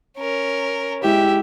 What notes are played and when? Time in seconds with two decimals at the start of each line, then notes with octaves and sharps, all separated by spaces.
0.17 C#4 A#4
1.03 G#3 E4 G4 E5 G5